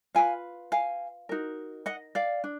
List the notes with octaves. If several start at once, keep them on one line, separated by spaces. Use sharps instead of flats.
F4 B4 F5 G#5
F5 G#5
D#4 F#4 A#4
D#5 F#5
D5 F5
D4